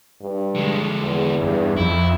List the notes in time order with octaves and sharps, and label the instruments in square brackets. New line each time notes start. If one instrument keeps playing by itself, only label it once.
[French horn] G2
[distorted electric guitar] D3 G#3
[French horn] E2
[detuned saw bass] G2
[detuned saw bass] F2 [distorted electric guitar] E4